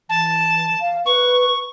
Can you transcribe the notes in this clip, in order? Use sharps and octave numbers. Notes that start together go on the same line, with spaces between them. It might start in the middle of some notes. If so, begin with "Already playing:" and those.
E3 A5
F5
B4 C#6